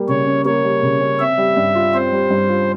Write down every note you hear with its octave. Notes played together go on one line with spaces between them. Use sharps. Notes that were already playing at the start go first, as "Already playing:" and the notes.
Already playing: G3 A#3
C#3 C#5
C#4
A#3 C#5
G3
C#3
C#4
C4 E5
G3
G2
F4
C4 C5
G3
G2
F4